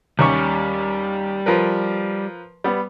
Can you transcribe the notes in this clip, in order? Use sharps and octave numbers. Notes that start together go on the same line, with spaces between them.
D#2 G3 C#4 C#6
F3 A#4 B4
G3 B3